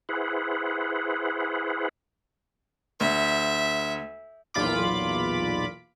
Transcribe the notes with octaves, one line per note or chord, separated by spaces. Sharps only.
E4 G#4 B4 C5 F#5
D2 E5
B1 E2 A#2 F4 B5 D6